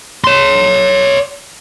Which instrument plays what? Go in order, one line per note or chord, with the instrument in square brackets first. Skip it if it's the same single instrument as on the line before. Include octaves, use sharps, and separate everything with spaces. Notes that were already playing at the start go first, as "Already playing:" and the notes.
[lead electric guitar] C#5 C6